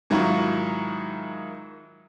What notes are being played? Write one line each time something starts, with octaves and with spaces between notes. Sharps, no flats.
G#2 D#3 F#3 E4 F4 C#6